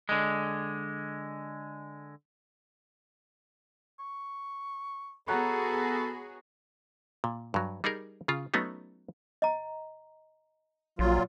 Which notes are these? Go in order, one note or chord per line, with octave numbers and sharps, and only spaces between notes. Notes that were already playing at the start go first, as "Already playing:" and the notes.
D3 G#3
C#6
B3 F#4 G#4 A4 C#5 F#5 A#5 B5
A#2
G2 F#3
G3 D#4 G#4 A#4
C#3 F4
F#3 A3 B3 C#4 D#4
D#5 A#5
A#1 A#2 F#3 F4